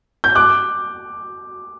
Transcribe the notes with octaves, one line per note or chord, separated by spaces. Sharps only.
G6
D6 F#6